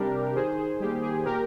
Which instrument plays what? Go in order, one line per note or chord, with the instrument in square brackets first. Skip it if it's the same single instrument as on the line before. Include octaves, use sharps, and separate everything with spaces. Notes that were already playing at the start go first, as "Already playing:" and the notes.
Already playing: [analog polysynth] C3 G3 D4 G4 A#4
D#3 G#4 C5
G#4
G3 A#3 G4
G#4
A#2 G4 A#4